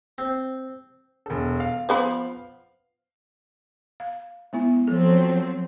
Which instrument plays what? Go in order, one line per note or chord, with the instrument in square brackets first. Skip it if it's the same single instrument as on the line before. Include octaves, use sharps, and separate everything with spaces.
[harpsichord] C4
[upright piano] E1 A4
F5
[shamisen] F3 B3 B5
[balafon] F5
G#3 B3 E4
[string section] F3 F#3 C4 [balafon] A4